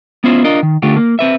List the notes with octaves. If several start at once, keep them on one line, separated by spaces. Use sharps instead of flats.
B3 C#4 E4 F4 C5
D4 F4 A#4 D#5
D#3
D3 A3 D4 F4 G4
A#3
C4 B4 E5